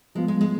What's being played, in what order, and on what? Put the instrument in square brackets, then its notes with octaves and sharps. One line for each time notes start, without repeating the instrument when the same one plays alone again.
[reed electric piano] F3 B3 F4 [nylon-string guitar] G#3
[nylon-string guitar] G#3
G#3